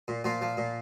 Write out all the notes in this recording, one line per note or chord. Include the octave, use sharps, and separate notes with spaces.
A#2
A#2 F3 F4
F3
A#2